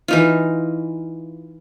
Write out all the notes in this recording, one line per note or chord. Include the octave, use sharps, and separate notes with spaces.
E3 D#4 F4